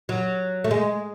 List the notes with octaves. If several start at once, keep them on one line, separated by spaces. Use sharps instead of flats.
F#3
A3
G#3